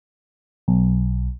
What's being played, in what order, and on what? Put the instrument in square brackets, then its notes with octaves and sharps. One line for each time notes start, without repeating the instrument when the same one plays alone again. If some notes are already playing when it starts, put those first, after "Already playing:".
[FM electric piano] B1